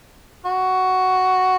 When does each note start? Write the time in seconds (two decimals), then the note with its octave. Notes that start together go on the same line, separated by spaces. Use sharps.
0.45 F#4